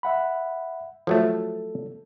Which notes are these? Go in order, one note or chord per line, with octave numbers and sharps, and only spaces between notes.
E5 F#5 B5
F3 F#3 A3 A4